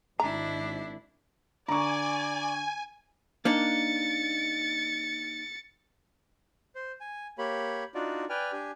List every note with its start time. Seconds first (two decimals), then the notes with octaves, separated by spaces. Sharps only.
0.20 G#1 D4 E4 A#5
1.68 D3 D5 G#5 A#5 C#6
3.45 A#3 D4 D#4 A6 C#7
6.75 C5
7.01 G#5
7.38 A#3 G4 C#5 B5
7.95 D4 D#4 F4 F#4 D5
8.29 B4 D5 G5 G#5 F6
8.52 D4 G4 G#5